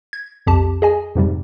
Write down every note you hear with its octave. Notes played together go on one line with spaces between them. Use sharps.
G#6
B1 F2 G4 A5
G#4 D#5 G#5
F2 G#2 C3 G3